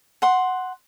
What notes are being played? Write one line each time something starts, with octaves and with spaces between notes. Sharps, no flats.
F#5 C6